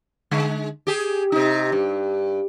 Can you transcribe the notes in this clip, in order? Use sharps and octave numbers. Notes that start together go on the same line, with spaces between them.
D3 G#3
G4 G#4
C3 D#4
G2